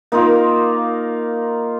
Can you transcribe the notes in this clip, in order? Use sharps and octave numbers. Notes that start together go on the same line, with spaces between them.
A#3 D#4 F4 A#4